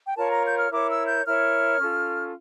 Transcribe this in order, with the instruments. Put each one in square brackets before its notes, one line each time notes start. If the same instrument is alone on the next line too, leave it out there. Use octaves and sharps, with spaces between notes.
[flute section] G5
F4 A#4 C#5 A5
A#5
G6
F6
E4 A#4 C#5 D6
E6
G6
E4 A#4 C#5 F6
C#4 F4 A4